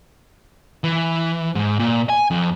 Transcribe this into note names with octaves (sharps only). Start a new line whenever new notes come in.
E3
G#2
A#2
G#5
F2